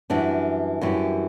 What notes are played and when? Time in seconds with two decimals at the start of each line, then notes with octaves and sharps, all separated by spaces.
0.10 F#2 E3 G3 D4
0.81 F#2 E3 G3